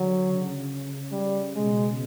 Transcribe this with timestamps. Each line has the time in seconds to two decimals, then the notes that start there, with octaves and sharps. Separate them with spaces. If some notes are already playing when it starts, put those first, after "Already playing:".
Already playing: D3 F#3
0.26 C#3
1.12 G3
1.56 B2 G#3